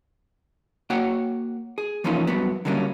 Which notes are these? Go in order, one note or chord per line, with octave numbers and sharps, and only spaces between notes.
A#3 F#4 C#5 F#5 G5
G#4
E3 F3 A#3 C#4 D#4 F4
G2 F#3 B3
D3 F#3 G3 A#3 C#4